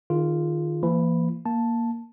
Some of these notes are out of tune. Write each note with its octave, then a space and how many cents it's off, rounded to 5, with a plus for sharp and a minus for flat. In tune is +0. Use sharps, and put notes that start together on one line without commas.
D#3 -25 F4 -5 G#4 +0
E3 +40 A#3 +0 B5 +0
A#3 +0 A5 +0